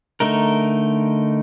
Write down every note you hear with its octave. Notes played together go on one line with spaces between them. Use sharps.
D3 A3 D#4 A#4